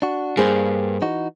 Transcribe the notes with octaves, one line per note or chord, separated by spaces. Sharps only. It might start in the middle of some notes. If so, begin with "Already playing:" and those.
D4 F#4
G2 A#3 G#4 C5
E3 D#4 F#4